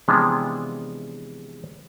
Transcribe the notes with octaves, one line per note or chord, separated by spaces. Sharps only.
C3 E3 F3 G#3 B3 D4